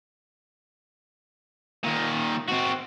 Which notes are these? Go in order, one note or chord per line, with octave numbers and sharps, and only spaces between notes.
A#2 D#3
C4 F#4